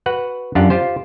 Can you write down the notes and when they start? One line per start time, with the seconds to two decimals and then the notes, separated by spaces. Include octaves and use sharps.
0.06 F#4 B4 F#5
0.55 F#2 D4 F4 G4 F#5
0.70 F4 G4 C5